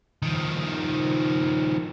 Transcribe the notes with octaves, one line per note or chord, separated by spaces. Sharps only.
D#3 F3